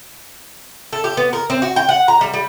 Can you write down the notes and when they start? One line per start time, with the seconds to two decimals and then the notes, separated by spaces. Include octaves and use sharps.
0.93 A4
1.04 G4
1.17 B3
1.33 A#4
1.50 C4
1.62 F#4
1.76 G5
1.89 F#5
2.08 A#5
2.21 G3
2.34 G3